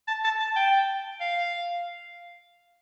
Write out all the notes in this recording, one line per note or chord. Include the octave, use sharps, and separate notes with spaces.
A5
A5
A5
G5
F5